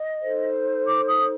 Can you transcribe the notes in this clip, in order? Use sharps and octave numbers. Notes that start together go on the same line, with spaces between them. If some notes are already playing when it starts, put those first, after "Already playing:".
Already playing: D#5
D#4 A4 C5
D6
D#6